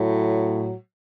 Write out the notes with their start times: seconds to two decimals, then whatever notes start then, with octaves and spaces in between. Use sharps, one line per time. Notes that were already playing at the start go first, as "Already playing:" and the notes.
Already playing: A2 F#3